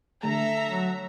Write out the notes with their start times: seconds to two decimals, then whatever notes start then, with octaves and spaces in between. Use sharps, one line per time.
0.23 D3 A3 A4 E5 A#5
0.68 F#3